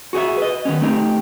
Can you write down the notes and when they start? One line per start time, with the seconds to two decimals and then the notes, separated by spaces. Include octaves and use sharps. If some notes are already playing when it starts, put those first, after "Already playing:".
0.13 F#4 G#4 C#5 E5
0.37 B4 D#5
0.65 D#3 B3 C#4
0.81 A3 C4 D#4 G4